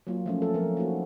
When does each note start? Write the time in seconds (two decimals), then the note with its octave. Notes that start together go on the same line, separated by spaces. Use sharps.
0.07 F#3 A#3 F4
0.26 F3 A3 C#4
0.42 A4
0.54 F3 C4 A#4
0.77 A#3 D#4 F#4